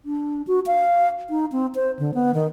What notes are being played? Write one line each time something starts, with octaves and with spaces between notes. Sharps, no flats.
D4
F#4
F5
D#4
C4
C5
D3
B3
D#3